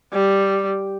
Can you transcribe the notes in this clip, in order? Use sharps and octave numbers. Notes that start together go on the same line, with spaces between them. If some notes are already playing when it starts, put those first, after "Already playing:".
G3